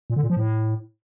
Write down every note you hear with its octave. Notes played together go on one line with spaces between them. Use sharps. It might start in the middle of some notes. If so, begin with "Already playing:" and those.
A#2
D3
A#2
F3
A2